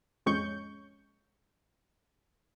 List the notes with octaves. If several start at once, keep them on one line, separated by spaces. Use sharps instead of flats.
A1 F2 G#3 C#4 C#6 G6